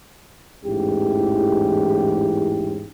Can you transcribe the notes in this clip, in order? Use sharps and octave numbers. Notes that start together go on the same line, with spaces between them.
A1 E2 G#2 C#4 E4 G4